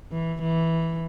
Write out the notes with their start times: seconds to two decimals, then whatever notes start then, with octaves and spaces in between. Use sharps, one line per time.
0.11 E3
0.41 E3